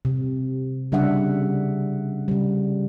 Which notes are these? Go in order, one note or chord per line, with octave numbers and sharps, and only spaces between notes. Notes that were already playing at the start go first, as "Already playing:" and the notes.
C3
C#3 G3 D4 E5 F#5
C#3 G3